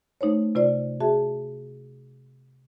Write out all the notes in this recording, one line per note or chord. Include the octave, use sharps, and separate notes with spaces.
A3 D#4 C5 C#5
C3 F4 C5 D5
F#4 G#4 E5 A5